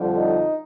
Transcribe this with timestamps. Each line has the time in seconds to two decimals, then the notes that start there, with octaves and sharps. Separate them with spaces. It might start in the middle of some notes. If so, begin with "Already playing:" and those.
Already playing: F2 D3 G3
0.16 D#4